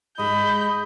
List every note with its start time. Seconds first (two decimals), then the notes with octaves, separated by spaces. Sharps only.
0.18 G#2 G#3 D#5 B5 G6